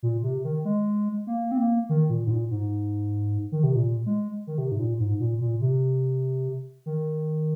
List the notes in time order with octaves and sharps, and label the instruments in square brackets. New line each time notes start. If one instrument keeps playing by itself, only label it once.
[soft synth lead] A#2
C3
D#3
G#3
A#3
C4
A#3
D#3
A#2
G#2
A#2
G#2
D#3
C3
A#2
G#3
D#3
C3
G#2
A#2
G#2
A#2
A#2
C3
D#3